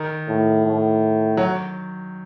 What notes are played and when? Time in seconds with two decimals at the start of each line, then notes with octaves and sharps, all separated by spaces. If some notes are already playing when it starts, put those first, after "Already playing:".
Already playing: D#3
0.28 A2
0.66 A2
1.37 F#3